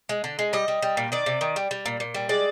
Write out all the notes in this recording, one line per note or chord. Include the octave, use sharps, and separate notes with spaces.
G#3
D3
G#3
G3 D#5
G3
G3
A#2
D#3 D5
C3
D#3
G3
G3
A#2
A#2
G3
G#3 D5